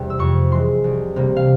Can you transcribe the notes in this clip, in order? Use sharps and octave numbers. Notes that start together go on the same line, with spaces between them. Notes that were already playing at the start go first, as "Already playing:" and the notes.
Already playing: E1 E2 C3 G3
E6
F2 C#6
E3 G#3 C6
C2
C3 G3 A#3
F5